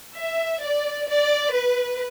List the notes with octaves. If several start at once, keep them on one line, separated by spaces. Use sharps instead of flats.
E5
D5
D5
B4